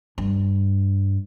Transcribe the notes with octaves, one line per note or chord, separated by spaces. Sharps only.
G2